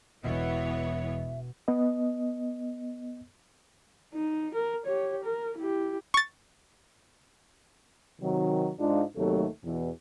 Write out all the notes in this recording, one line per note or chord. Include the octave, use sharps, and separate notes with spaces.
E1 B2 E3 B3 C#5 D#5 E5
B3 D#5
D#4
A#4
G4 C#5
A#4
E4 G4
C#6 A6
C3 D#3 F#3
G#2 G#3 D4 D#4 F4
D#2 C3 F#3 A3
E2 B2